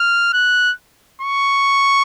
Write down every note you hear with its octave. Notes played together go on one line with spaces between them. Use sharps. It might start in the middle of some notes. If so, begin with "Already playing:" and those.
Already playing: F6
F#6
C#6